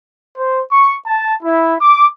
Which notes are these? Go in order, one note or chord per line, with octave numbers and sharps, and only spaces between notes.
C5
C#6
A5
E4
D6